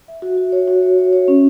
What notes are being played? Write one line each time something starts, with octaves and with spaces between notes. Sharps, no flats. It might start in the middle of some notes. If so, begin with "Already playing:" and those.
E5
F#4
F#4
C#5
F#4
C#5
C#5
C#5
C#4